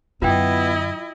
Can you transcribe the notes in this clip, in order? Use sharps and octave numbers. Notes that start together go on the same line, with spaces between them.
F#2 D3 B3 E4 F4 D#5 G5